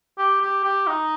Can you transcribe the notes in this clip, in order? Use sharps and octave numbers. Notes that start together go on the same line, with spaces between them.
G4
G4
G4
D#4